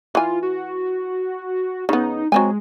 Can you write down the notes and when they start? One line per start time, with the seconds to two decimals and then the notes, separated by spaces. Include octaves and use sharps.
0.15 E3 F4 G#5
0.43 F#4
1.89 C#3 B3 D#4
2.32 F#3 G#3 C4 G#5